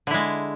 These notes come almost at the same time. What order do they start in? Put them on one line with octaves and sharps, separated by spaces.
D3 E4 G#3